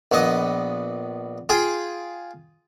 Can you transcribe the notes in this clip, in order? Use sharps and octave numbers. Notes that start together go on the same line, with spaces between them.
A#1 B3 D#5
F4 G#4 G5